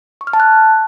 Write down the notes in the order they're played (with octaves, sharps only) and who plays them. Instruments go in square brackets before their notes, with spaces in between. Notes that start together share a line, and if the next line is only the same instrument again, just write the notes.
[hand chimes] C#6
F6
A5
F#6